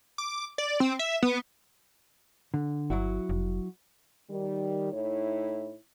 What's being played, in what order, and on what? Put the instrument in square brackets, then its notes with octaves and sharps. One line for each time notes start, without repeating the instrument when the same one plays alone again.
[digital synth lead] D6
D5
C4
E5
B3
[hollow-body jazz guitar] D3
[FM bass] G1 [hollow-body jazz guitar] F#3 E4 F#4
[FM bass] F1
[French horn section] D#3 G3
A2 D#4 E4 C#5